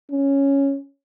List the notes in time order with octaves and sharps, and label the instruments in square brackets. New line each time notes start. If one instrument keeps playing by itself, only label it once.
[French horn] C#4